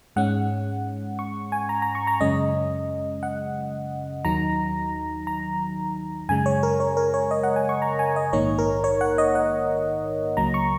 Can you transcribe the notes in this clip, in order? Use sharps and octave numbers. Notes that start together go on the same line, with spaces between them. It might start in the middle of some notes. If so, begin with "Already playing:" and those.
G#2 G#3 C#4 F#5
C#6
G#5
A#5
A#5
C#6
A#5
F#2 C#3 G#3 C#4 D#5
F#5
D#2 D#3 F#3 D#4 A#5
A#5
F#2 C#3 G#3 G#5
C#5
A#4
C#5
A#4
C#5
D#5
F#5
G#5
C#6
A#5
G#5
D#5
A#1 G#2 D#3 A#3 D#4 C#5
A#4
C#5
F#5
D#5
F#5
C#2 C#3 F#3 A#3 A#5
C#6